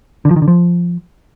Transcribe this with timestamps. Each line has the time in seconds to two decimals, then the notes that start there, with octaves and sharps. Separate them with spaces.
0.25 D3
0.31 F3
0.36 D#3
0.42 D3
0.48 F3